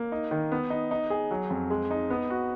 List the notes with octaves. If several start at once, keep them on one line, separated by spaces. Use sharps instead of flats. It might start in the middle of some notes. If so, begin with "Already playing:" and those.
Already playing: A#3
D#4
D#3
B3
D#4
D#4
G#4
F#3
F2
G#3
D#4
B3
F#4